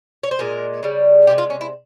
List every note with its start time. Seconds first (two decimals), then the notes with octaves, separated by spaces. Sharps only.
0.23 C#5
0.31 C5
0.39 A#2 G#3 A#4
0.83 C#3 G3
1.27 C3 F3 G#3 G4
1.38 F4
1.50 C#4
1.61 E4